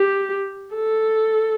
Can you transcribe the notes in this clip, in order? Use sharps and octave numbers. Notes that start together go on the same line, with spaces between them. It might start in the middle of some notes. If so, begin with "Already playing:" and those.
Already playing: G4
A4